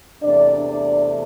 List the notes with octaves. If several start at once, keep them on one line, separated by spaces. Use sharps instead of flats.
E2 C3 A3 D4 D5
D4 D5